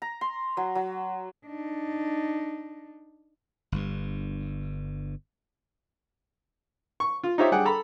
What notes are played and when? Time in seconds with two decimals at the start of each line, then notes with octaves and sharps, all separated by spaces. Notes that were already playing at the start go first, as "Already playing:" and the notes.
0.02 A#5
0.21 C6
0.57 F#3
0.75 F#3
1.46 D4 D#4
3.72 G1 G2
7.00 C#6
7.23 F4
7.38 D#4 F4 G4 C5 C#5 E5
7.52 G3 D4 G#4 F#5 G5
7.65 A4 A#5 B5